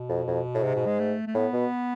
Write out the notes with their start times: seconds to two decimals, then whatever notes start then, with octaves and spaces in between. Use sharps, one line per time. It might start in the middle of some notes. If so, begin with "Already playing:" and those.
Already playing: B2
0.09 F2
0.28 F2
0.55 A2
0.63 G#2 C3
0.75 B2
0.87 G#3
0.99 A3
1.27 A3
1.34 A2 B3
1.53 B2